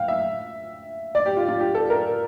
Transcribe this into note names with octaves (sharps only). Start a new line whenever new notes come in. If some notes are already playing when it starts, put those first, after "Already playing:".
Already playing: F5 G5
E5
D5
G4
F4
F4
G4
A4
A#4